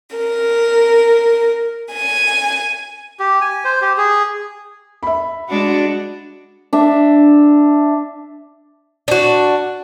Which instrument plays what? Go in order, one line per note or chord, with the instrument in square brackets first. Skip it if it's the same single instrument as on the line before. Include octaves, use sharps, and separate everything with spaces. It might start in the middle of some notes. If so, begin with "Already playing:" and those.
[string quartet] A#4
G#5
[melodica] G4
G#5
C5
G4
G#4
[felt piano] E5 B5
[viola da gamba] G#3 D4 F#4
[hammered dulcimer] D4 E5
[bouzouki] D4 F#4